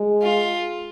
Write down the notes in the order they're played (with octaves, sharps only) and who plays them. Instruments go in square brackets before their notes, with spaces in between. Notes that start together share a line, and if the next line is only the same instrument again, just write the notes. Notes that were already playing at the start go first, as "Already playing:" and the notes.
Already playing: [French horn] G#3
[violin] F4